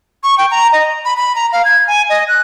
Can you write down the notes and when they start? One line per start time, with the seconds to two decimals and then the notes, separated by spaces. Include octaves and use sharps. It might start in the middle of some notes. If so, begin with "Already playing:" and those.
0.23 C#6
0.38 G5
0.51 A#5
0.73 D#5
1.05 B5
1.17 B5
1.36 A#5
1.52 F5
1.65 G#6
1.87 G#5
2.10 D#5
2.28 F#6